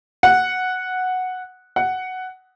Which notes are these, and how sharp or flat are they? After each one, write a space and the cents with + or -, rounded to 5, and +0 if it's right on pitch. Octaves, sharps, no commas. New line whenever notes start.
F#5 -5
F#5 +5